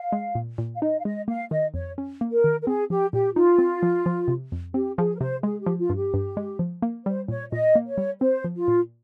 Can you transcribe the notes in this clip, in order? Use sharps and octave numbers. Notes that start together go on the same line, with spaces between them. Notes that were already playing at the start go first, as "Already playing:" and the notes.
Already playing: F5
G#3
A#2
A#2
F5
D#4 D#5
F5
G#3 D#5
A#3 F5
D#3 D#5
F2 C#5
C#4
A#3
A#4
D#3
A#4
C4 G#4
F3 G4
A#2 G4
D#4 F4
C4
F3
F3
C3
F2
C4 G4
F3 G#4
A#4
C3 C5
G#3 G#4
G4
F3
F4
G2
G4
G2
G#3
F3
A#3
G3 C5
A#2 C#5
A#2 D#5
A#3
C#5
G3
C4 C5
F3
F4
A#2